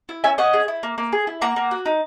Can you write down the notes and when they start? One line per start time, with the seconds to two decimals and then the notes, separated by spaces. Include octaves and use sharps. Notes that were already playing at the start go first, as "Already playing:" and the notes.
0.09 E4
0.24 C#4 E5 G#5
0.38 C#4 D#5 F#5
0.53 G#4
0.68 E4
0.83 A#3
0.98 A#3
1.12 G#4
1.27 E4
1.41 A#3 F#5 A#5
1.56 A#3
1.71 F#4
1.86 D#4